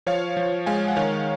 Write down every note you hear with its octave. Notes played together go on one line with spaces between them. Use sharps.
F3 C#5 F5
F3
G#3 F5 G#5
F#5
D#3 C#5 F5